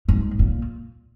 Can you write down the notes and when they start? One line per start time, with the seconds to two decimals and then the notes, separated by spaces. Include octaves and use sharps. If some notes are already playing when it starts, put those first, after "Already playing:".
0.09 G#2
0.39 A#2